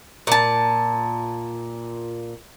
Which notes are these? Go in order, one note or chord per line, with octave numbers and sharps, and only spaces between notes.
A#2 A5